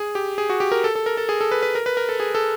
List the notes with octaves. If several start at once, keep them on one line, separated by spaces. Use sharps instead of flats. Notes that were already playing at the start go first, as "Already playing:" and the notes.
Already playing: G#4
G4
G#4
F#4
G4
A#4
A4
A4
A#4
A4
G#4
A4
B4
B4
A#4
B4
A#4
A4
G#4
A4